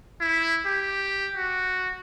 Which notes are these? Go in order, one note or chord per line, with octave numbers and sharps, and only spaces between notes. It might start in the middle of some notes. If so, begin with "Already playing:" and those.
E4
G4
F#4